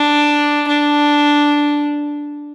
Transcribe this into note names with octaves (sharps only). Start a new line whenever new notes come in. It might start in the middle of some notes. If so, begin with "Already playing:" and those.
Already playing: D4
D4